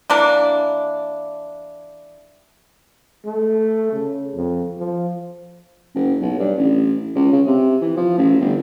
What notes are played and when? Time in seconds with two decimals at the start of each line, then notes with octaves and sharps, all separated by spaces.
0.10 E3 A#3 D4
3.26 A3
3.92 C#3
4.35 F2
4.78 F3
5.94 F#1
6.21 B1
6.39 G2
6.57 A1
7.15 C#2
7.32 C#3
7.47 C3
7.81 E3
7.96 F3
8.18 A1
8.40 G1